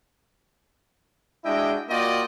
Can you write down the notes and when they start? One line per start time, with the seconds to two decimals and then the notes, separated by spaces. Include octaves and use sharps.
1.44 G#3 D4 E4 F#4 D#5 G5
1.89 A#3 F4 F#4 D5 D#5 G5